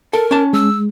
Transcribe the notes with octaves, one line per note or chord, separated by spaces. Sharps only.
A4 A#4
C#4 A5
G#3 E6